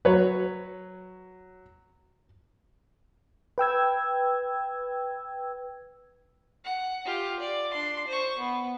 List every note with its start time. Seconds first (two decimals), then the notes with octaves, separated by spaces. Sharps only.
0.05 F#3 B4 C#5
3.58 B4 G5 E6 G#6
6.64 F#5
7.05 F4 G4
7.39 D5
7.73 D4 C6
8.07 C5 C#6
8.38 B3